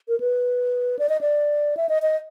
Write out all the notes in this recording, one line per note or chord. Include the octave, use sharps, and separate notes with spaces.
A#4
B4
D5
D#5
D5
E5
D#5
D#5